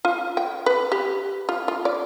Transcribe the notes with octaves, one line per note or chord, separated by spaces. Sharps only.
F4
G5
B4
G4
F4
F4
D5